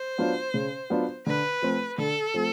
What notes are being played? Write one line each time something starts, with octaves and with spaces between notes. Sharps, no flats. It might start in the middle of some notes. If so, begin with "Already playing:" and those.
Already playing: C5
F#3 B3 D4 F4
C#3
F#3 B3 D4 F4
D3 B4
F3 A3 C4
D3 A4
F3 A3 C4